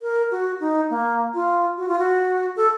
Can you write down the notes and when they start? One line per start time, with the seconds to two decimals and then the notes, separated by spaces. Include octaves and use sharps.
0.02 A#4
0.31 F#4
0.60 D#4
0.90 A#3
1.34 F4
1.78 F#4
1.88 F4
1.99 F#4
2.56 A4